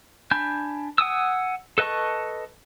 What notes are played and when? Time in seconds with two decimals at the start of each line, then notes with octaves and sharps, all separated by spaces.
0.31 D4 G#5 B5 G6
0.98 F#5 G#5 D#6 E6
1.78 A4 B4 D#5 A5 C#6